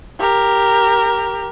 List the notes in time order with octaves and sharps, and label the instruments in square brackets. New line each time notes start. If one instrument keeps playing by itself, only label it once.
[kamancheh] G4 A#4